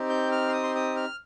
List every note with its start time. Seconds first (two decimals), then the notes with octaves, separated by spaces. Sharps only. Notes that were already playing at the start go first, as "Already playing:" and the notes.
Already playing: C4 D#4 G4
0.09 G6
0.32 F6
0.48 C6
0.53 D#6
0.64 C6
0.75 D#6
0.96 F6